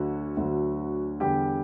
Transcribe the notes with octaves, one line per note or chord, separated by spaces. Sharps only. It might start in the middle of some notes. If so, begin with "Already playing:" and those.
Already playing: D2 D3 F#3 F#4
D2 D3 F#3
E2 D3 G3 G4 G5